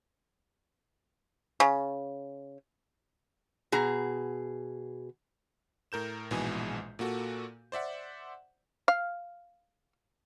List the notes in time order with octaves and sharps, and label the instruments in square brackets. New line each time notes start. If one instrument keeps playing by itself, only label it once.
[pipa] C#3
[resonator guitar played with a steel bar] B2 G#4 A#5
[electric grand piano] A2 A#4 G6 E7
A#1 G#2 B2 E3 G#3 G#5
A#2 A#3 F#4 A4
C5 D5 E5 F#5
[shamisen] F5